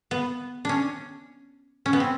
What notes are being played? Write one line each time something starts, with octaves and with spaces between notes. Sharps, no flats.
B3
C#4 D4
C#4
B3
C4